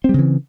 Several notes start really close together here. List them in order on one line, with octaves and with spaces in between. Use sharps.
C4 G3 C#3 E3